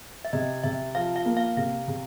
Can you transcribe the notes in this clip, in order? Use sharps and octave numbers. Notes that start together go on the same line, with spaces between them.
E5
C3 D#5
C3 E5
F3 F5
F5
A#3
F5
C3 F5
C3